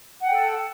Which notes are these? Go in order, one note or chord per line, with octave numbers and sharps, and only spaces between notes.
A4 F#5 G5